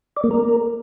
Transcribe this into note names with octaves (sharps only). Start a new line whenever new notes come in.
D5
A#3
A#4